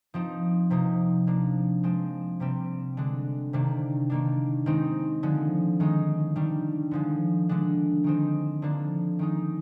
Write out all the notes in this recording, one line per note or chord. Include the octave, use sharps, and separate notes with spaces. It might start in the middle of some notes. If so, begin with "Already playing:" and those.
F3 C4 D#4
C3 F3 A#3 D#4
F3 A#3 D4
F3 G#3 C4
C3 G3 C4
D3 G#3 D4
C3 D#3 A#3 D4
D#3 A#3 D4
D#3 G#3 C4 D#4
D3 F3 G#3
D#3 G#3 D#4
D#3 G3 D4
D3 F3 G#3
D3 G#3 D4
D#3 G#3 C4 D#4
D3 F3 A#3 D4
D#3 G#3 D#4